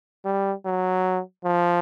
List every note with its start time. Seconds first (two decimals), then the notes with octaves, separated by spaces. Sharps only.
0.25 G3
0.65 F#3
1.44 F3